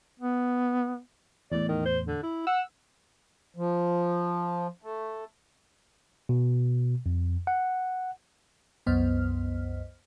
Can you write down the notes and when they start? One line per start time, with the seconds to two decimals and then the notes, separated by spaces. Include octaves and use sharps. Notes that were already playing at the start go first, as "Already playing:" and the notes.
0.20 B3
1.52 E2 A2 D5
1.68 D#3
1.86 C5
2.07 D3
2.23 E4
2.47 F#5 E6
3.57 F3
4.82 A3
6.29 B2
7.06 F2
7.47 F#5
8.87 C2 F#2 B3 C5 D#5 F6